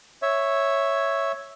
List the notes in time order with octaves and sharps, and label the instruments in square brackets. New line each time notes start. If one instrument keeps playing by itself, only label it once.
[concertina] C#5 E5